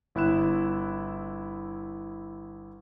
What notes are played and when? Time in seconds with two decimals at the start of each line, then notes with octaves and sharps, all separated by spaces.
0.15 G1 E4 F#6 E7